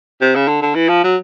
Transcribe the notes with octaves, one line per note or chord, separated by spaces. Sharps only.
C3
C#3
D3
D3
E3
F3
F#3